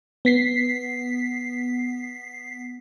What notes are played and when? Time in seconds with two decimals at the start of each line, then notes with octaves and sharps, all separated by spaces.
0.25 B3 B6 C7